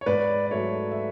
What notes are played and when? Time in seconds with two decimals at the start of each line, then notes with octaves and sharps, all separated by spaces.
0.01 C#5
0.06 G#2 B4 D5
0.46 D5
0.51 F#3 A3 C#5 E5
0.91 E5